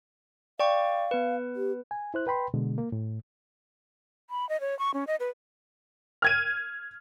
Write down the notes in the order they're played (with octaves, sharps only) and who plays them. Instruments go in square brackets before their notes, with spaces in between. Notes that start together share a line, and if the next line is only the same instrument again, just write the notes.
[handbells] D5 G5 C#6 [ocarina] F5
[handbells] B3 B4
[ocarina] G4
[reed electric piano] G#5
E4 C5 F#6
B4 G5 B5 C6
B2 D3 G#3
A#3
A2
[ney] B5
D#5
C#5
C#6
C#4
D#5
B4
[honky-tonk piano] F6 G#6 D#7